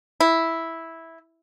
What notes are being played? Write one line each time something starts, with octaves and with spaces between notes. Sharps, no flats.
E4